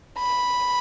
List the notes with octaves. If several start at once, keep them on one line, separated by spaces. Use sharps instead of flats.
B5